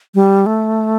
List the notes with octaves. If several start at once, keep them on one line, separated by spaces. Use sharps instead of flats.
G3
A3